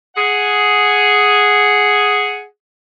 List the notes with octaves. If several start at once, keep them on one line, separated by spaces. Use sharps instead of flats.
G#4 F#5